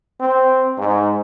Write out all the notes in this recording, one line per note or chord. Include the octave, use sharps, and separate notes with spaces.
C4
G#2